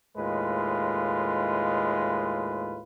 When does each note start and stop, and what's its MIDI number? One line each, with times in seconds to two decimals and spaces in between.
0.17 2.82 39
0.17 2.82 45
0.17 2.82 56
0.17 2.82 65
0.17 2.82 71